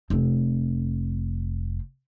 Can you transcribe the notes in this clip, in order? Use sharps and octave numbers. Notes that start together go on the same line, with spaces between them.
F1 C4